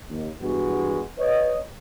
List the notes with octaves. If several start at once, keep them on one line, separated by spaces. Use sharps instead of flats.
D#2
E2 G2 G#3 B3 F#4
B4 C#5 D#5